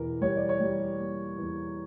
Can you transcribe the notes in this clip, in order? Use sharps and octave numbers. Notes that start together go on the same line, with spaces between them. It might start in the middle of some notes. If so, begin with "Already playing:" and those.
Already playing: E2 B2 A#4
G3 C#5
D5
C#5
G3
A#3
E2